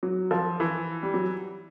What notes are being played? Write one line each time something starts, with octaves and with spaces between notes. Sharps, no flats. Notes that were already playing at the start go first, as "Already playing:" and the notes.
F#3
F3
E3
G3
F#3